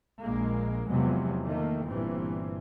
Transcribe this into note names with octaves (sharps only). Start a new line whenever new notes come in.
A#1 G#3 A#3
E2 C3 F3 F#3 G#3
D#3 A3 A#3
G1 G2 A#2 E3 C4